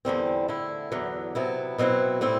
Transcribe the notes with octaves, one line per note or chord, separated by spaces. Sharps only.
E2 D3 G3 C4
D3 A3 E4
E2 D3 F#3
C3 F#3 B3 E4
B2 F#3 C4 E4
A2 G3 C4 E4